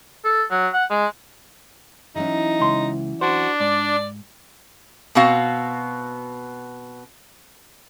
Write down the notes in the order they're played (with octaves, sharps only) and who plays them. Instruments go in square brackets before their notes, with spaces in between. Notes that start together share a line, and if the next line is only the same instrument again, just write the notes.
[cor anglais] A4
F#3
F#5
G#3
[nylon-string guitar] E3 F#3 C#4 [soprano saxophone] D#4
[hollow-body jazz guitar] C#2 C6
[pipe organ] D4 [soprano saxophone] F#4 [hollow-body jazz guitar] C5
[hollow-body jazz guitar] G#2 [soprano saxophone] D5
[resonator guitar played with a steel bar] B2 B3 C4 F#4 F5